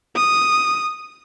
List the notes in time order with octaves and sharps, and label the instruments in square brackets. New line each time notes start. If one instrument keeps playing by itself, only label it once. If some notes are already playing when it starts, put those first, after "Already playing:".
[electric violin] D#6